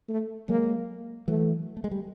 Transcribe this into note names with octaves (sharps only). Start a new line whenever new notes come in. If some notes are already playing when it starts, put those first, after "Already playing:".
A3
F#3 G#3 A#3
E3 F#3 A3
A3
G#3
G3